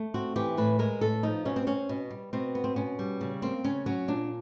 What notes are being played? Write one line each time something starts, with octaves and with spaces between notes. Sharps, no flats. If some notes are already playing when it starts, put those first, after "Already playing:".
Already playing: A3
C4 F#4
E3 G4
A2 B4
G#3 A#4
A2 A4
F3 D#4
B2 C#4
C4
C4 C#4
B2
G3
B2 C4
B3
C4
B2 C#4
G3
C#3
A#3 C4
C#3 C#4
F#3 C#4
A#2 D4